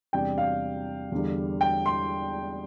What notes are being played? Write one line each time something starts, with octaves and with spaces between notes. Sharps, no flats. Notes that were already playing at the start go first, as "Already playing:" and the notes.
E2 C3 G3 D4 G5
F5
E2 D3 G3
G5
C6